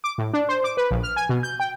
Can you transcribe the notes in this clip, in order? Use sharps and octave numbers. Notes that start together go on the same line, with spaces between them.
D6
A2
D4
C5
D6
B4
A#1
F6
G#5
B2
G6
G5